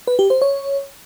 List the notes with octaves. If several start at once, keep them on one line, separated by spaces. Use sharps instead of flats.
B4
G4
C5
C#5